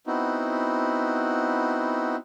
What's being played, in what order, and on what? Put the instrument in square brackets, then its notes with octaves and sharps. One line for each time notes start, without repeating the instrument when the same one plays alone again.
[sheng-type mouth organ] B3 C4 D#4 E4 F#4